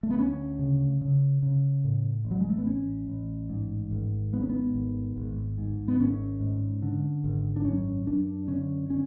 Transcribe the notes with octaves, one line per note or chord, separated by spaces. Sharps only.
A3
B3
D2 C#4
C#3
C#3
C#3
A2
A1
F#3
G#3
A3
B3
A1 C#4
A1
G#2
G#1
G#2 B3
C#4
B3
G#1
G#1
G#2
B3
G#1 C#4
G#2
D3
G#1
D4
F#2 C#4
F#2 D4
D3 C#4
D3 C#4